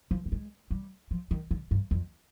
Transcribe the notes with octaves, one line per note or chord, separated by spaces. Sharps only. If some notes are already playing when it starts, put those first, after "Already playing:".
F3
B3
G#3
G3
F3
D#3
D3
G2
F2